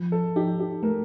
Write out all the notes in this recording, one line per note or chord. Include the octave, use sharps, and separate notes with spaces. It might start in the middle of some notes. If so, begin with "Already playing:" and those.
Already playing: F3
A4
D#4 G4
G4
A3 A#4